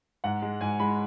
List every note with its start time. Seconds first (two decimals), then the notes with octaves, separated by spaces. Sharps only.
0.24 G#2 F#5
0.42 G#3
0.61 G#2 G#5
0.79 G#3 B5